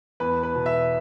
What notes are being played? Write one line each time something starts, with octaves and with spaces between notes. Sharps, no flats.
E2 B4
B4
B2
E5